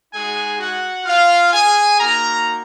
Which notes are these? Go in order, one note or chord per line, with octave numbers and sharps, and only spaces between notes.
G#3 D#4 F#4 G#4 G#5
F#4 F#5
F4 F5
G#4 G#5
A#3 D#4 F#4 A#4 A#5